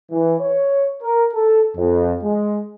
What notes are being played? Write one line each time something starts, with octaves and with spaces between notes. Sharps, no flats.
E3
C#5
A#4
A4
F2
G#3